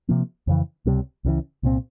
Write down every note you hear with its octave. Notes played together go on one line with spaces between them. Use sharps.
C3 F3 A#3
F2 C#3 E3
C#2 C3 G3 C4
C#2 C#3 E3
C2 A#2 G#3 C4